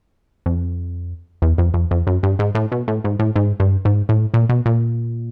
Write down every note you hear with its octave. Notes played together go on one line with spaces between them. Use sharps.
F2
E2
F2
F2
F2
F#2
G2
G#2
A2
B2
A2
G#2
A2
G#2
G2
G#2
A2
A#2
B2
A#2